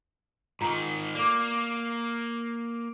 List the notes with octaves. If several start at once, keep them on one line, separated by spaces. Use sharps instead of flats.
G#2 D#3 F4 A#5
A#3 D5 D6